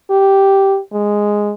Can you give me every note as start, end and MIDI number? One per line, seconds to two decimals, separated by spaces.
0.11 0.79 67
0.93 1.53 56